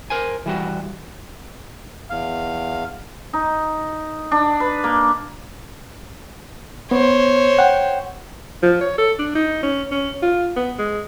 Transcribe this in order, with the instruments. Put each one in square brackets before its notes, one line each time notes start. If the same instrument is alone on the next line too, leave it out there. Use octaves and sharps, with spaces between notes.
[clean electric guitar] A#4 C5 G#5
E3 G3 F#4
[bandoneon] E2 F5
[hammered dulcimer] D#4
D4
B4
A#3
[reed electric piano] B3 [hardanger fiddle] C5 C#5
[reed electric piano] F#5 G5
[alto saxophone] F3
C#5
A4
D4
D#4
C#4
C#4
F4
B3
G#3